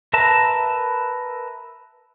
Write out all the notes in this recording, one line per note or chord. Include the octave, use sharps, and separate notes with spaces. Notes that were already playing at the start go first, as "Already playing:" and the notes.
A#4 B4 E5 A5 A#5